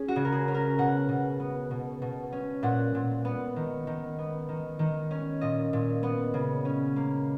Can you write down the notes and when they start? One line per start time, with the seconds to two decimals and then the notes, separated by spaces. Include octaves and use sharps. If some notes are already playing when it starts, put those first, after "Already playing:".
Already playing: C#4 G#4
0.08 F#4
0.16 C#3
0.25 A#4
0.32 G#4
0.48 C#4
0.55 A#4
0.78 B2 F#5
1.09 B2
1.40 B3
1.71 B2
2.02 B2
2.32 C#4
2.63 A#2 F#5
2.95 A#2
3.25 B3
3.56 D#3
3.87 D#3
4.19 B3
4.49 D#3
4.79 D#3
5.11 C#4
5.41 A#2 D#5
5.73 A#2
6.03 B3
6.34 C#3
6.65 C#4
6.96 A#3